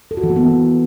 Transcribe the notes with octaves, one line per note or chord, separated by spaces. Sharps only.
A4
F#4
E3
A#3
B3